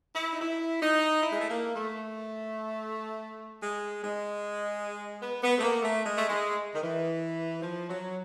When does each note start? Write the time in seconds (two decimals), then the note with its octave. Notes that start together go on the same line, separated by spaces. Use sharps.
0.15 E4
0.31 D#4
0.41 E4
0.82 D#4
1.22 E4
1.31 G#3
1.40 A3
1.49 A#3
1.76 A3
3.62 G#3
4.02 G#3
5.22 B3
5.42 B3
5.58 A3
5.62 A#3
5.82 A3
6.03 G#3
6.17 A3
6.29 G#3
6.75 D#3
6.82 E3
7.62 F3
7.89 F#3